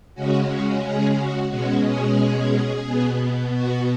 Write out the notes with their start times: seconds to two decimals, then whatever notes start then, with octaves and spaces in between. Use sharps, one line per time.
0.15 C#3 G#3 C#4 F#4
0.49 F#4
0.83 G#4
1.17 F#4
1.50 B2 G#3 C#4 F#4
1.84 G#4
2.86 B2 B3
3.54 F#4